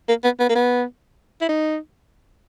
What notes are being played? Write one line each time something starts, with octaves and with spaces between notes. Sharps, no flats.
A#3
B3
B3
A#3
B3
E4
D#4